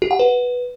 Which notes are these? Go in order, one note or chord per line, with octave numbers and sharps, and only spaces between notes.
G4
F#5
B4